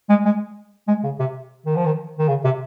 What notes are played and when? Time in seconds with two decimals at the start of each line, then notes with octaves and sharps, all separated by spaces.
0.09 G#3
0.25 G#3
0.88 G#3
1.04 C#3
1.19 C3
1.66 D#3
1.76 F3
1.86 D#3
2.19 D#3
2.28 C#3
2.44 C3